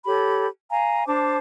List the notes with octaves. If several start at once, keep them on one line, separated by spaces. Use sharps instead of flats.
G4 A4 C#5 B5
F5 G#5 A#5
D4 C5 A5 D6